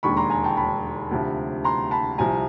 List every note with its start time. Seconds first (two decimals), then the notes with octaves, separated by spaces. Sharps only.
0.03 E1 D#2 D3 B5 C#6
0.17 A#5 C6
0.30 G#5 A#5
0.44 G5 A5
0.57 A5 B5
1.11 D2 C3 F3
1.64 A#5 C6
1.91 A5 B5
2.18 C2 C3 F3 G#5 A#5